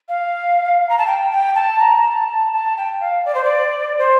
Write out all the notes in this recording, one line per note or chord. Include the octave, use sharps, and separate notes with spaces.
F5
A#5
A5
G5
G5
A5
A#5
A5
A5
A5
G5
F5
D5
C5
D5
C5